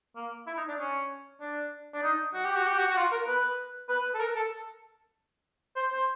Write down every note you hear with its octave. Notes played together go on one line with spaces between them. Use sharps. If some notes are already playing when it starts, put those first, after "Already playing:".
A#3
E4
D#4
D4
C#4
D4
D4
D#4
F#4
G4
F#4
G4
F#4
F#4
F4
A#4
B4
B4
A4
A#4
A4
C5
C5